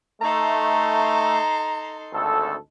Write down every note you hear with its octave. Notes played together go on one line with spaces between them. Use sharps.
A3 D#4 A4 A#5 C6
G#1 D2 A4